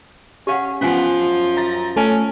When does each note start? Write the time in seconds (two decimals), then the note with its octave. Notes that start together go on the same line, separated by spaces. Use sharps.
0.47 C#4 G4 F5 F#5
0.81 F3 B3 C#4 G#5
1.19 F#2
1.57 F5 A#5 A6 A#6
1.96 A3 C#4 G#5 A5